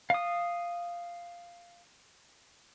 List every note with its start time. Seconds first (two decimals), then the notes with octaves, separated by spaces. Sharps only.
0.10 F5 D#6